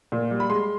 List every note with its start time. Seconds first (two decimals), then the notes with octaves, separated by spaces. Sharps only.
0.12 A#2
0.31 G3
0.40 B5
0.50 G#3 C6